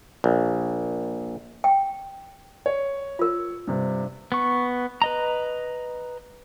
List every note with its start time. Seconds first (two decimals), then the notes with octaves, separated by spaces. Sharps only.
0.24 A#1
1.64 G5
2.66 C#5
3.19 F4 A#4
3.67 G2 C3
4.32 B3 C#6
5.02 B4 D#5 A#5